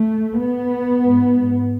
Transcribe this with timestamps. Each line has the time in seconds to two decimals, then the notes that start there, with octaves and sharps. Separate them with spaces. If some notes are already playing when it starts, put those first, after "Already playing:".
Already playing: A3
0.40 B3
1.02 G#2